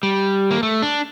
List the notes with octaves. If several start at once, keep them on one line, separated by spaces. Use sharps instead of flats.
G3
A#3
A3
D4